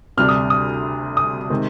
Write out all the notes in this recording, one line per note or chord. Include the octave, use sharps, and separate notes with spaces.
D2 C3 G3 D4 F6
D#6
D#6
D#6
C3 D#3 G#3 C4